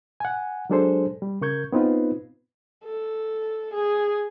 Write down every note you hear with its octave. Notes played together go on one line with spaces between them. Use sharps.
F#5 G#5
F#3 G#3 D4 G#4 A4 C5
G3
C#3 A#4 C#6 G6 G#6
B3 C4 D#4 F4 B4
A4
G#4